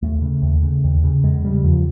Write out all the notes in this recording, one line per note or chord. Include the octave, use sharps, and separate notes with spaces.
D#2 A3
C#3
D#2
C#3
D#2
C#3
E2 G#3
C#3 G3
E2 F3